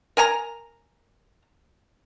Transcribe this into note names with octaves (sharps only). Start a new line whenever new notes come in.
A#4 G#5 A#5